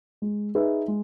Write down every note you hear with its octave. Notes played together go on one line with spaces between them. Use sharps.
G#3
D#4 G#4 B4 E5
G#3